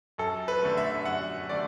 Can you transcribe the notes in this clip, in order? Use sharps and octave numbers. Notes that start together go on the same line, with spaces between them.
F#2 A4
B4
D3 A3
E5
F#2 F#5
D3 A3 D5